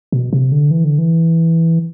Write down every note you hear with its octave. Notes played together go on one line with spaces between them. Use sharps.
B2
C3
D3
E3
D3
E3